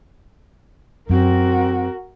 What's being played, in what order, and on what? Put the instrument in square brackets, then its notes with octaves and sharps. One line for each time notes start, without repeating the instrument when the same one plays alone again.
[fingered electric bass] F#2 [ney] C4 [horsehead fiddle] F#4 A#4